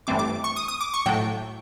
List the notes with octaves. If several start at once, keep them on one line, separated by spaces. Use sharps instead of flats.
G2 E3 A3 C4 D6
D6
C#6
D#6
D#6
D6
C#6
A2 F#3 A3 G5